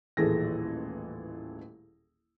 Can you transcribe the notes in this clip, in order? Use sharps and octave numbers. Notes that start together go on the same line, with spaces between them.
D#1 A1 E3 G#4 A4 A#6